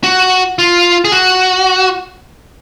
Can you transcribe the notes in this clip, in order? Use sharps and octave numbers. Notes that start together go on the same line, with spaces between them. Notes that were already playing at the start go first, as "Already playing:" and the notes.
F#4
F4
G#4
F#4